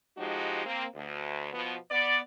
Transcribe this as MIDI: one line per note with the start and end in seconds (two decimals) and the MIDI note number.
0.18 0.64 53
0.18 0.64 56
0.18 0.64 63
0.18 0.64 66
0.18 0.64 67
0.66 0.85 58
0.66 0.85 60
0.95 1.51 38
1.53 1.77 47
1.53 1.77 53
1.53 1.77 59
1.91 2.19 59
1.91 2.19 74